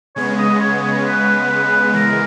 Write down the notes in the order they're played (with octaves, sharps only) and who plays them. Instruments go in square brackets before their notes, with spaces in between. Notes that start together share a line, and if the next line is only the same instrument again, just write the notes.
[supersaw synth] C#3 G#3 B3 [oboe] C#5
[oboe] D#5
C#5
C#5
B4
B4
[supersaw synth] E3 G#3 [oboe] A#4